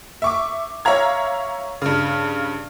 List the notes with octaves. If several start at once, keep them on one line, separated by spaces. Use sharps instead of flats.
E5 C#6 D6
C#5 E5 F5 A#5 G#6
G2 C#3